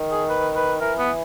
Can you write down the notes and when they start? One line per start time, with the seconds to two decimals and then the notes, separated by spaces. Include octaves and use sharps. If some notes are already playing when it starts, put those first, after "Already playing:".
Already playing: D#3
0.11 G#4
0.29 B4
0.56 B4
0.81 E3 A#4
0.99 B3